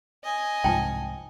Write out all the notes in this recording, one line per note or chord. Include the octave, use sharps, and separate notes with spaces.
D#5 G#5
C2 G#2 F3 G5 A5